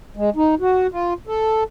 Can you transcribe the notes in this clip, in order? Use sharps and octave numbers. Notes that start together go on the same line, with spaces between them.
G#3
D#4
F#4
F4
A4